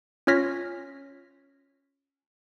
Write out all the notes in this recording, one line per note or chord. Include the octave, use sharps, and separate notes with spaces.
C#4 F4 C#5 F6 A#6 B6